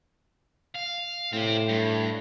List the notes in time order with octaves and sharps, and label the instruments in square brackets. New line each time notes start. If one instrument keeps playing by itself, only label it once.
[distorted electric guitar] F5
[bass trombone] A2 [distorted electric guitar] C4 G4
[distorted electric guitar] G2